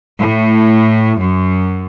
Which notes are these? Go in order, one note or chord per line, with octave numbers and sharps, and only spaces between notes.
A2
F#2